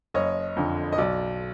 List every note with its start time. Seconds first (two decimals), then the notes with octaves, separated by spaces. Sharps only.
0.14 F#1 C#5 D#5
0.56 F2 D3
0.92 D#5
0.98 B1 D5